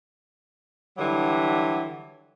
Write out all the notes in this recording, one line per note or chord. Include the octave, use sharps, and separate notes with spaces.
D3 E3 F#3 G3